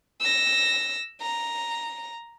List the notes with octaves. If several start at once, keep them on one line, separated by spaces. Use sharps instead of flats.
E6 A#6
A#5